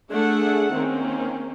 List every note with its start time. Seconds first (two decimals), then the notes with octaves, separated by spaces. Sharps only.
0.11 A3 D4 G#4 A4 E5 F#5
0.74 D#3 A#3 C4 C#4